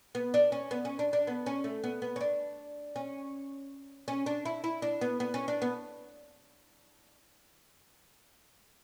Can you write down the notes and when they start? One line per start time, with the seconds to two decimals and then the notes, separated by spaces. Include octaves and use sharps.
0.15 B3
0.34 D4
0.52 C#4
0.71 B3
0.85 C#4
0.99 D4
1.13 D4
1.27 B3
1.46 C#4
1.64 A3
1.84 B3
2.02 B3
2.16 C#4
2.21 D4
2.96 C#4
4.08 C#4
4.26 D4
4.45 E4
4.64 E4
4.82 D4
5.01 B3
5.20 B3
5.34 C#4
5.48 D4
5.62 B3